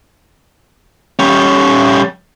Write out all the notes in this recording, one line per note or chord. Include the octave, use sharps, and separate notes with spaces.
G3 C#4